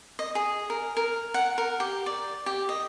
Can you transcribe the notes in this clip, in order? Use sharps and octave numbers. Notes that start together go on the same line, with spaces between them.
D#5
G#4
A#4
A#4
F#5
A#4
G4
D5
G4
D#5